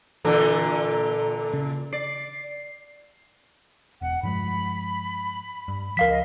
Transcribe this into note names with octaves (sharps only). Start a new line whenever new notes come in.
A#2 D3 E3 A4 A#5
C#3
D5 C7
E1 F#5
G2 F3 G#3 B5
G2
C#2 F3 A#4 F5 B6
D#5